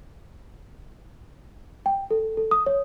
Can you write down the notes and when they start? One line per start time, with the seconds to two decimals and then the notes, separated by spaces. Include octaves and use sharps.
1.86 G5
2.11 A4
2.37 A4
2.51 D#6
2.66 C#5